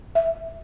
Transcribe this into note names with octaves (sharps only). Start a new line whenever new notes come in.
E5